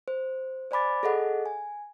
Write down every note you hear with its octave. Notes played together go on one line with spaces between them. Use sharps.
C5
C5 D5 G#5 B5 D6 A6
G#4 A4 D#5 F#5
G#5